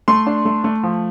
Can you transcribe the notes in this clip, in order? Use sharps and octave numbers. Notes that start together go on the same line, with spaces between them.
A3 C6
D4
A3
A3
F3